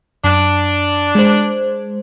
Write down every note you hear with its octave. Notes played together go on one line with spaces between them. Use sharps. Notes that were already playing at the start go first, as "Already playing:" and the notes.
F#2 D4
G#3 C5